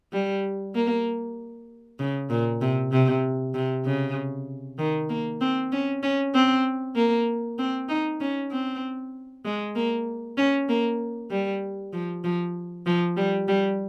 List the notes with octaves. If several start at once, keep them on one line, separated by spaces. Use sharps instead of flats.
G3
A#3
C#3
A#2
C3
C3
C3
C#3
D#3
A#3
C4
C#4
C#4
C4
A#3
C4
D#4
C#4
C4
G#3
A#3
C#4
A#3
G3
F3
F3
F3
G3
G3